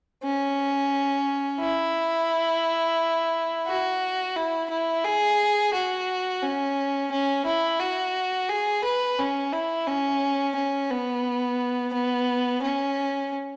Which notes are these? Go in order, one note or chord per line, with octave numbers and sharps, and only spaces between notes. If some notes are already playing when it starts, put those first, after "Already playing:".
C#4
E4
F#4
E4
E4
G#4
F#4
C#4
C#4
E4
F#4
G#4
B4
C#4
E4
C#4
C#4
B3
B3
C#4